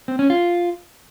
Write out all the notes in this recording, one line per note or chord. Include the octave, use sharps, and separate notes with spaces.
C4
C#4
F4